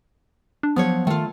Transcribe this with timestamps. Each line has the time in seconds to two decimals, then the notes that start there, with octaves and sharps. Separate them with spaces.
0.63 D4
0.76 F3 F#3 B3 C#5
1.07 D#3 A3 F4